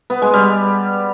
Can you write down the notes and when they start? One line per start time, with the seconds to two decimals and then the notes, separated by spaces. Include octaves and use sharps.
0.10 B3
0.22 G#3
0.34 G3